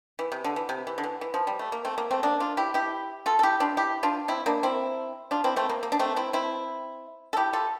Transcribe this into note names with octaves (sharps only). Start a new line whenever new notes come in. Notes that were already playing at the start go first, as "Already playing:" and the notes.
E3
C3
D3
E3
C3
E3
D3
E3
E3
F3
G3
A3
A#3
A3 C4
A#3
A3 C4
A#3 D4
D4 F4
E4 G4
E4 G4
F4 A4
A4
E4 G4
D4 F4
E4 G4
D4 F4
C4 E4
A#3 D4
C4 E4
D4 F4
C4 E4
A3 C4
A#3
A#3
D4
A3 C4
C4 E4
C4 E4
A4
E4 G4
F4 A4